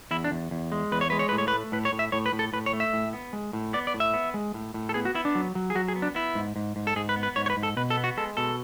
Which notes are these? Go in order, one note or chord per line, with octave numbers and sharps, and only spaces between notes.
E2 E4
D4
E2
E2
G#3
E2 B4
C#5
G#3 B4
C#5
A2 B4
C#5
B4
A3
A2 B4
C#5
A2
E5
A2 C#5
B4
A2
A4
A2 B4
C#5
A3
E5
A2
B3
G#3
A2
B3 D5
D5
A2
E5
B3
G#3
A2
A2
A4
B3 G#4
F#4
B3 E4
D4
F#3
F#3
G#4
F#3 F#4
G#4
B3
D4
B3 E4
G#2
G#2
G#2
A4
G#2 G#4
B4
B3
B4
G#2 C#5
C#5
B4
G#2
A4
B2 B4
A4
B3
F#4
G#3 A4
B2 A4